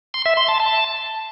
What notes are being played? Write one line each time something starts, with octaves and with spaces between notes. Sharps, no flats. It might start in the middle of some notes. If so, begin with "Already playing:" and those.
C6
E5
C6
A5
A5